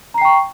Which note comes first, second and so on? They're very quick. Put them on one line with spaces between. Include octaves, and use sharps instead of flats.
A#5 C7 G5 C#6